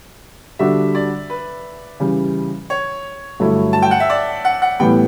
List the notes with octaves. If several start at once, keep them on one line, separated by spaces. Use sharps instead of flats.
D3 G3 D4 F#4 E5
D5
B4
C#3 E3 G3
C#5
G2 D3 F#3 A3 E4
A5
G5
F#5
E5
D5
F#5
F#5
A2 E3 G3 B3 G5